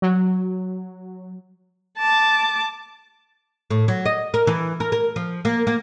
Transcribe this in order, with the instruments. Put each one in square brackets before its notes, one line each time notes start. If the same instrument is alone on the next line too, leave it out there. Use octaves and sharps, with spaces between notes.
[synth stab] F#3
[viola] A5 D6
[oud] A2
F#3
D#5
A#4
E3
A#4
A#4
F3
A#3
A#3